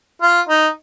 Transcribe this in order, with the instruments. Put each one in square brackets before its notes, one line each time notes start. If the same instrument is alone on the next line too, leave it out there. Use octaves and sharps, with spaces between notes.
[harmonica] F4
D#4